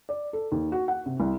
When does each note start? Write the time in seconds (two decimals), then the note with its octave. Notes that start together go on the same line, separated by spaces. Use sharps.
0.09 D5
0.33 A4
0.52 D#2
0.72 F#4
0.88 F#5
1.06 C3
1.20 C2